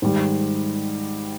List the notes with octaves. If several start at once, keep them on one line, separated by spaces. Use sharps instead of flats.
G#2 D#3 G3